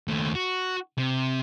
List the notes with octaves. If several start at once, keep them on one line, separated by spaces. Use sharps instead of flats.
D#2 A3
F#4
C3